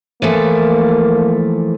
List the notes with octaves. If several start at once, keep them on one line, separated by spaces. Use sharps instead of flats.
E3 F3 A3 A#3